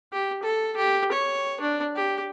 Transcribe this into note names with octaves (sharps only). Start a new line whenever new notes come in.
G4
A4
G4
C#5
D4
G4